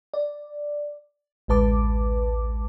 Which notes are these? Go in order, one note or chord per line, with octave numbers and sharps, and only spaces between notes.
D5
A1 D2 G#3 B4 A5 D6